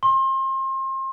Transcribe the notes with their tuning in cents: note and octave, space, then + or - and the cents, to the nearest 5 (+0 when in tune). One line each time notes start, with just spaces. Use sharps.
C6 +35